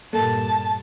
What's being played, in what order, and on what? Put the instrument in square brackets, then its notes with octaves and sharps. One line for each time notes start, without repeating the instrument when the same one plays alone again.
[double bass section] G2 A#2 [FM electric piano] A#3 [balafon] A4 [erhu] A5